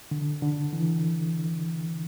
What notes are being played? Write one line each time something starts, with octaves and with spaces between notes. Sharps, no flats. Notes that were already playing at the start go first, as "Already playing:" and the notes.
D3
D3
E3